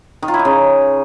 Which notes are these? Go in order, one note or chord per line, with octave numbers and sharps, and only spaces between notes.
D#3
F4
E4
D#4
C#3